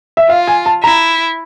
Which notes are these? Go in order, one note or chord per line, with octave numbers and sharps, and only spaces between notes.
E5
F4 F5
G#5
A5
E4 A#5